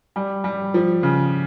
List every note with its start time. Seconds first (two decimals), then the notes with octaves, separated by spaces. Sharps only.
0.16 G3
0.44 G3
0.74 F3
1.03 C#3